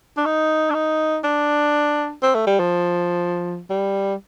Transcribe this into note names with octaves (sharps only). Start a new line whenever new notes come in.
D4
D#4
D4
D#4
D4
C4
A3
G3
F3
G3